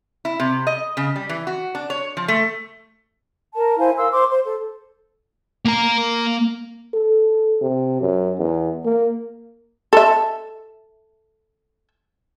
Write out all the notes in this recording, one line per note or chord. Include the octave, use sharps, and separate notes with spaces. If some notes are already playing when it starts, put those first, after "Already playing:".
E4
C3
D#5
C#3
G3
E3
F#4
D4
C#5
F3
A3
A#4 A5
E4 C5 F5 G#5
A#4 F5 C6 E6
C5 C6 D6
C5
A4
A#3 A#5
A4
C3
F#2
E2
A#3
A4 E5